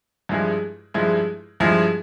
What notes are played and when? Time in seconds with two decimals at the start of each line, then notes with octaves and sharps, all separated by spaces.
0.29 G2 F3 G#3 E4 G#4
0.94 G2 F3 G#3 E4 G#4
1.60 G2 F3 G#3 E4 G#4